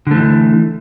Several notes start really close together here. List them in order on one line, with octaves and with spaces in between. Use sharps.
D3 A3 E3